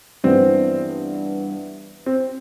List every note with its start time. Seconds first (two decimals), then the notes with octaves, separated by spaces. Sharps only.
0.24 G2 E3 B3 C4
2.06 C4